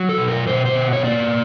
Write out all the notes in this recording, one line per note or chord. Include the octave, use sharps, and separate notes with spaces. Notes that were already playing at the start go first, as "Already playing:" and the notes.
Already playing: F#3
A4
B2
A#4
B2 C5
C5
B3
C#5
A#3 D5